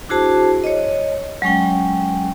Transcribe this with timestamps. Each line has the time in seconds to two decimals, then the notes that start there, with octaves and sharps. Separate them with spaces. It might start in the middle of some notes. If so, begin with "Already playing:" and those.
0.09 D4 E4 F#4 G#4 C5 A5
0.64 C#5 D#5
1.42 F#3 G#3 C#4 G5